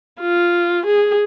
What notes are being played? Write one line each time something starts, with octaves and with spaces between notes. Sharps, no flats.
F4
G#4